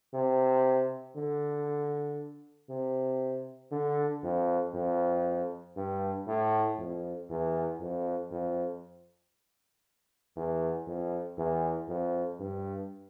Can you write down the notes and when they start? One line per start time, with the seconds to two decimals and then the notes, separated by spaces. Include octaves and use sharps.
0.14 C3
1.16 D3
2.70 C3
3.71 D3
4.23 F2
4.75 F2
5.77 G2
6.27 A2
6.78 F2
7.29 E2
7.80 F2
8.31 F2
10.36 E2
10.87 F2
11.38 E2
11.88 F2
12.40 G2